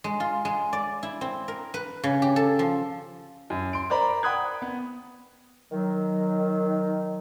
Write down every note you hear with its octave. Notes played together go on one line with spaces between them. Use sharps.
G#3
F4
G#3
D5
E4
C4
A#4
B4
C#3
G4
A4
F3
F#2
C6 D7
A#4 C5 D5 A#5 B5
F#5 G5 B5 D#6 F#6 G#6
B3
D#3 F#3